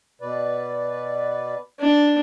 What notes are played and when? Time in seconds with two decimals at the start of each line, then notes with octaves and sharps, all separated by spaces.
0.21 B2 B4 D5
1.80 D4